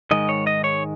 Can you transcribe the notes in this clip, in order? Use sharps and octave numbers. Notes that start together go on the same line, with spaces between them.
G#2 D#3 G#3 D#5
C#5
D#5
C#5